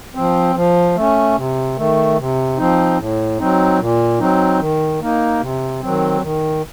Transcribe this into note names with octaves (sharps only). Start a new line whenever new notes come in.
F3 C4
F3
A3 C#4
C3
D#3 A3
C3
F3 C4 D#4
A2
F#3 C4 D#4
A#2
F#3 C4 D#4
D#3
A#3 D#4
C3
D#3 F#3 C4
D#3